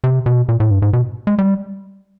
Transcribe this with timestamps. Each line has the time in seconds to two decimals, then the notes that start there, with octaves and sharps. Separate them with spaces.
0.04 C3
0.26 B2
0.49 A#2
0.60 A2
0.71 G2
0.82 G#2
0.93 B2
1.27 G#3
1.38 G3